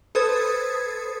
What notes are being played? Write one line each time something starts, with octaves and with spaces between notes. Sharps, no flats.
A4 B4 C5 D#6 G#6 A6